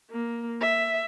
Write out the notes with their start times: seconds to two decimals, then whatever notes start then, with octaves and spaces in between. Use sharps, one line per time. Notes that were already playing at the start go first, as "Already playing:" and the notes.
0.11 A#3
0.61 E5